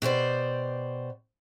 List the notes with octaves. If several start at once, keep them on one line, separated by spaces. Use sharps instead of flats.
B2 G4 C5 D5